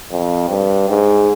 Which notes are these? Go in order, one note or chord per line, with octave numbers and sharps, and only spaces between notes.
F2
G2
G#2